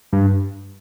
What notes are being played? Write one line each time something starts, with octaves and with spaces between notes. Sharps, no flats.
G2